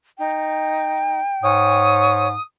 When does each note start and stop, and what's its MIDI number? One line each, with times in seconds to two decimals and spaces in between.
0.19 1.21 63
0.19 1.83 79
1.43 2.33 44
1.43 2.27 73
1.43 2.42 87